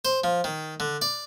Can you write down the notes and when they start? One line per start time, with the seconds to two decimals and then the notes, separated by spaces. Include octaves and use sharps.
0.05 C5
0.24 F3
0.44 D#3
0.80 D3
1.02 D5